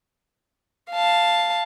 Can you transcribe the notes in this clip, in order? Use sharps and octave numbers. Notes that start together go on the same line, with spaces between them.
F5 A5